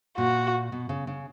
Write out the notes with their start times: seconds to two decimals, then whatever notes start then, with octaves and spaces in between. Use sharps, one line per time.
0.18 A#2 F#4
0.72 B2
0.89 C#3
1.07 C#3